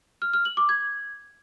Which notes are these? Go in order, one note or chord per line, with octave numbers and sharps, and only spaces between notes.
F6
F6
F#7
D6
G#6